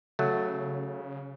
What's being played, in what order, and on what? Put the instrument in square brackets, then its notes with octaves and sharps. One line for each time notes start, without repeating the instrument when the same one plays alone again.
[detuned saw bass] C#3 [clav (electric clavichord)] F#3 A3